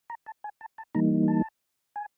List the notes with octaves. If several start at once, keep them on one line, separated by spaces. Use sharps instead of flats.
A#5
A5
G#5
A5
A5
E3 G3 A#3 D#4 A#5
A5
G#5